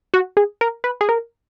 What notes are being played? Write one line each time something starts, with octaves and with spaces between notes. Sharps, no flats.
F#4
G#4
A#4
B4
G#4
A#4